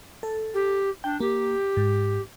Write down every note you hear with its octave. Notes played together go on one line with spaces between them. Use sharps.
A4
G4
D4 G5
A#3 G4
G#2